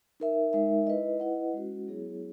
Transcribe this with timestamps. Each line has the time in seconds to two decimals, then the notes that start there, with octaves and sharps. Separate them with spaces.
0.20 D#4 A#4 E5
0.53 G#3 D#4 A#4 E5
0.87 E4 B4 D#5
1.20 E4 B4 D#5 F#5
1.53 G#3 C#4 F#4
1.88 F#3 B3 E4 G#4 C#5